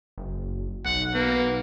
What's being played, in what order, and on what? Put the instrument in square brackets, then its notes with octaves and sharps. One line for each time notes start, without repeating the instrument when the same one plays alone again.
[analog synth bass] F#1
[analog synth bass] B1 [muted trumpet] F#5
[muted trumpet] A#3 [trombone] B3